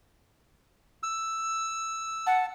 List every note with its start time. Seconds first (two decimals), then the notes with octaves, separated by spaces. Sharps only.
1.03 E6
2.27 F#5 A5